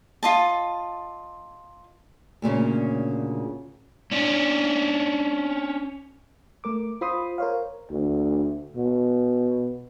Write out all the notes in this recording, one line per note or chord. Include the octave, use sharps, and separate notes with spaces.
F4 D#5 A5
D2 A#2 C#3 C#4
C#4 D4
A3 A#4 D6
F4 C5 B5 C6 D#6
A#4 C5 C#5 F5
D2
B2